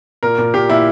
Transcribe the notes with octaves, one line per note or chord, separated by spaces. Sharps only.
A#2 A#4
A#2
A#2 G4
A#2 E4